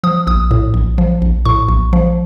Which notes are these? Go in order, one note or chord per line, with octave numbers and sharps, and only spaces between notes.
F3 D#6
A#1 D#6
A2
A#1
F3
A#1
A2 C#6
A#1
F3